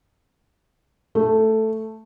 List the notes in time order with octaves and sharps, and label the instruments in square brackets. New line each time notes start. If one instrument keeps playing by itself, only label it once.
[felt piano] A3